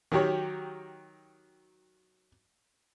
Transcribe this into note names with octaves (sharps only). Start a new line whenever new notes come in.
D#3 F#3 G4 C#5